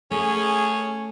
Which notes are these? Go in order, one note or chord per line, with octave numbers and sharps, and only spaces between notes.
A3 C#4 G#4